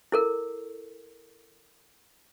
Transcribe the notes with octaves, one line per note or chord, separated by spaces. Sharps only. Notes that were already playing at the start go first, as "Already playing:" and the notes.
E4 A4 A#4